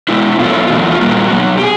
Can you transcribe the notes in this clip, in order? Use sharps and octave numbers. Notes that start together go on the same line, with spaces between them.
B2 G#3 B3 E4
B2 F#3 A3 F4
E2 B2 F#3 A3
F4
A#2 G3 A#3 F#4
B2 F#3 B3
G4
G#4